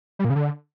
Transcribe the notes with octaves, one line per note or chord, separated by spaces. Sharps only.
G3
A#2
C#3
D3